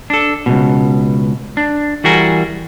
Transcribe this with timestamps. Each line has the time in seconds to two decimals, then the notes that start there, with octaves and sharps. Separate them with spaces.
0.10 D4 A4
0.46 C#2 G#2 B2
1.57 D4
2.04 E3 G3 F#4 G#4 A#4